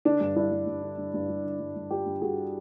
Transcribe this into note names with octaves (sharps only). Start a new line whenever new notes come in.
D3 D4
G2
G2 D4 E4
G2
G2
D3
G2
G2
G2
D3
G2
G2
G2 F4 G4
G2
G2 F#4 G#4